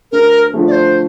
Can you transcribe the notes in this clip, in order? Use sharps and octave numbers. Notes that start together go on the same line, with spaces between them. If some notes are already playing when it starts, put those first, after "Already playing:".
D2 A#4
D3 F3 A3
D5
C5